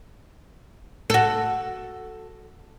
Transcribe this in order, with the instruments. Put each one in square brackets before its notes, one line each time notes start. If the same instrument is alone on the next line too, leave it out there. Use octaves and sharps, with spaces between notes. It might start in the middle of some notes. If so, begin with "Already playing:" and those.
[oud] F#4 A4